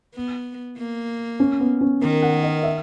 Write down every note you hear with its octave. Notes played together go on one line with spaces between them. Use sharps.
B3
A#3
C#4
B3
C#4
D#3 A#4
F#5
D#5
E5